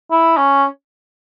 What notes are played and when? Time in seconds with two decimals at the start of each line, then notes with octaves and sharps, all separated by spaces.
0.11 E4
0.37 C#4